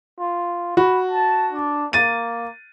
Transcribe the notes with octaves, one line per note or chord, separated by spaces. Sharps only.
F4
F#4 B5
A5
D4
A#3 A6 D#7